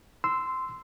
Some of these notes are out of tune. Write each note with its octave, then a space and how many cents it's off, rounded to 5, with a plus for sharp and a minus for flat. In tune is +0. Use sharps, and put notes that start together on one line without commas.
C6 -10 E6 +0